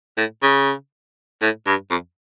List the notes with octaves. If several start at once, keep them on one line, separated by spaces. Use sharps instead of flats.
A2
C#3
A2
G2
F2